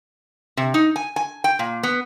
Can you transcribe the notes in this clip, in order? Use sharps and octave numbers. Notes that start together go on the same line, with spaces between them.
C3
D#4
G#5
G#5
G5
A#2
B3